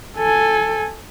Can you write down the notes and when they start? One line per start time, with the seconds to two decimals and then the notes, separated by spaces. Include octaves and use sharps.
0.17 A4 G#5